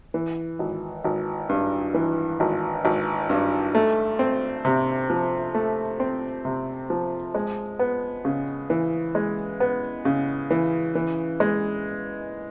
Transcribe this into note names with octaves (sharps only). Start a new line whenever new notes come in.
E3
G#1
G#1
G2
E3
G#1
G#1
G2
A3
C4
C3
F3
A3
C4
C3
F3
G#3
B3
C#3
E3
G#3
B3
C#3
E3
E3
G#3